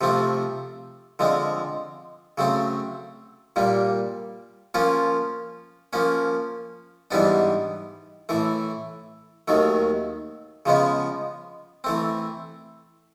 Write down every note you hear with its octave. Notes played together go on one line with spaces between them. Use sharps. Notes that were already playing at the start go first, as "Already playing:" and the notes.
C3 F3 A3 C4
D3 F3 G#3 C4
C#3 F#3 A3 C4
A#2 G3 A#3
F3 A#3 C#4 F4
F3 A#3 C#4
G#2 E3 G3 B3 D4
A2 E3 A3
D#2 D#3 F#3 A3
C#3 F3 G#3 B3
E3 A3 C4